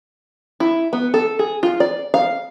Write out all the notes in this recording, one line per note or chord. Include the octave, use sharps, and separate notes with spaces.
E4
B3
A4
G#4
F4
D5
F5